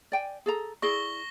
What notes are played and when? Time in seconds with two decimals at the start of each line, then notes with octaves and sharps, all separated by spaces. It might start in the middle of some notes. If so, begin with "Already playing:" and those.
0.12 D5 G5 G#5
0.46 G#4 A4 A#5
0.82 E4 G#4 D5 C#6 A#6 G7